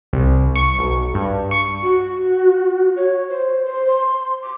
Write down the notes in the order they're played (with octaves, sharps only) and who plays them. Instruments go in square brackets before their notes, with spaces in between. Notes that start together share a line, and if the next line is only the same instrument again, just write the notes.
[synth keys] C2
C#6
B1
G2
C#6
[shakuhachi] F#4
C#5
C5
C5
C6
D6